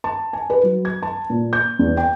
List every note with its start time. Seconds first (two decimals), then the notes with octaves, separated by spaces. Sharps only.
0.04 A5
0.33 G#5
0.50 B4
0.63 F#3
0.85 G#6
1.03 A5
1.30 A#2
1.53 G6
1.79 E2
1.97 G5